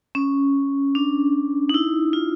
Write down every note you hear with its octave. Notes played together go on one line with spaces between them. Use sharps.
C#4
D4
D#4
E4
F4